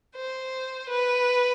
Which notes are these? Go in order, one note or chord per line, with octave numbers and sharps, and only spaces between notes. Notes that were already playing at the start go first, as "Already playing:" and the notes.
C5
B4